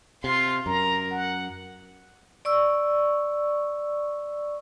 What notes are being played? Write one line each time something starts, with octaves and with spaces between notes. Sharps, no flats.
C3 F4 C6
F#2 A#4 A#5
F#5
D5 C#6 E6